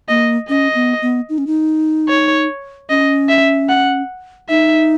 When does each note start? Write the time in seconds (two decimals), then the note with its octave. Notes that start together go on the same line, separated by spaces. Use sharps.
0.09 A#3 D#5
0.49 C#4 D#5
0.75 B3
1.02 B3
1.29 D#4
1.38 C#4
1.47 D#4
2.09 C#5
2.90 C#4 D#5
3.29 E5
3.69 F#5
4.49 D#4 E5